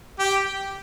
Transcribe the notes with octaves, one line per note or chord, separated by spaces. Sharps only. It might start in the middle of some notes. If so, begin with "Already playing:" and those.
G4